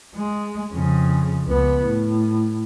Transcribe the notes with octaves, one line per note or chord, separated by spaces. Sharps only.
G#3
F2 C#3
C#2 B3
A2